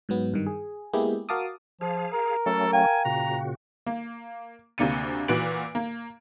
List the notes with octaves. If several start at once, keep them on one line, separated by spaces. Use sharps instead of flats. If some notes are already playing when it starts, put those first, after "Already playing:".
G#2 F#3 B3
G2 D#3
G#4
G#3 A#3 B3 E4 G4 G#4
F#4 A#4 F5 A5 D6 D#6
F3 G#4 F5
A#4
F#3 A3 C#4 A4
F5 G5 G#5
A#2 C#3 F#4 A#5
A#3
D2 C3 A#3 D4 C#7 D#7
A#2 E3 F#4 B4 D7 F#7
A#3